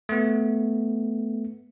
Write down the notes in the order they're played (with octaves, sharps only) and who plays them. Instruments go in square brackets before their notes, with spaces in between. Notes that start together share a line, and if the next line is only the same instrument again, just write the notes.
[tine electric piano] A3 B3